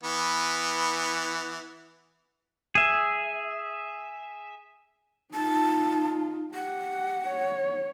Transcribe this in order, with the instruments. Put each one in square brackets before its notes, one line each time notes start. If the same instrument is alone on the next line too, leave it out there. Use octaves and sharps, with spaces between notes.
[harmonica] E3 B3
[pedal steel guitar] G#4 E5
[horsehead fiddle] D#4 F4 [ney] A5
[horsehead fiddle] G4 [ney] F#5
[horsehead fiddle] C#5